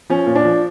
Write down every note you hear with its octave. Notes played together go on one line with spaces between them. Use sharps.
F3 C#4
A#2
D4
F3